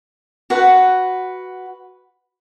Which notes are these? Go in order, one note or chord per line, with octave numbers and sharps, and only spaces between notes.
F#4 B4 F#5